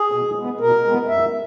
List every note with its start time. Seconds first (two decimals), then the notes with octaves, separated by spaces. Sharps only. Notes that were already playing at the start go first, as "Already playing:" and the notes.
Already playing: G#4
0.12 B2
0.35 G#3 B3
0.60 B2 A#4
0.84 G#3 B3
1.08 F#2 E5